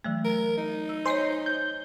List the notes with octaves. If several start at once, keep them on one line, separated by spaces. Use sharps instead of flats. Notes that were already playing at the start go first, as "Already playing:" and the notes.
E3 F#3 A3
A#4
D#4
E6
C5 C#5 D#5 G#5 C6
G6